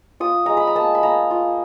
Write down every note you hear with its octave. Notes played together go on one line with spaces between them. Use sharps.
F4 D#6
G#3 A#5
B5
A#5
A#3 A5
B5
A#3 A#5
F4